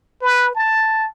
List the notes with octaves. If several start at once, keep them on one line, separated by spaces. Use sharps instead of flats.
B4
A5